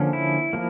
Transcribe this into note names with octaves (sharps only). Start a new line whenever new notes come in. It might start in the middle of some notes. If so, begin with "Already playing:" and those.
Already playing: D3 F3 A#3 C#4
E4
F3 A#3